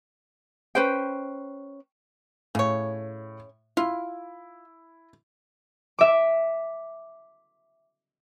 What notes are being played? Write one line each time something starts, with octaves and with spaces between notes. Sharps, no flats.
C#4 B4 C5 G5
A2 C#3 C#5
E4 F4
E5 D6